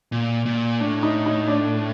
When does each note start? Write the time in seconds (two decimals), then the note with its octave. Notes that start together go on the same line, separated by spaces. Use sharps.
0.12 A#2
0.46 A#2
0.80 A2 D4
1.03 D#4
1.26 D#4
1.48 D4